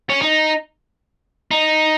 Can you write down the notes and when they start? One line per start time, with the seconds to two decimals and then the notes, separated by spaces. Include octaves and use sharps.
0.10 C#4
0.22 D#4
1.51 D#4